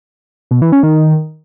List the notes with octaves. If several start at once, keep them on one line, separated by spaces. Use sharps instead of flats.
B2
E3
C#4
D#3